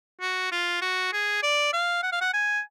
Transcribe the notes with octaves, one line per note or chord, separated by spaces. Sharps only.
F#4
F4
F#4
G#4
D5
F5
F#5
F5
F#5
G#5